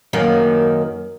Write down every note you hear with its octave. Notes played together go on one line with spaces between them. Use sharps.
F#2 D#3 A#3